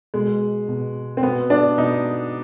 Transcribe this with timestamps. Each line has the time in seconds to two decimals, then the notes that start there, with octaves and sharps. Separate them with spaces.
0.14 B2 G#3
0.68 B2
1.17 C4
1.23 B2 B3
1.50 D4
1.78 B2 D#4